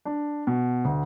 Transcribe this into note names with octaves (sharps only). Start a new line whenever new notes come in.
D4
B2
D2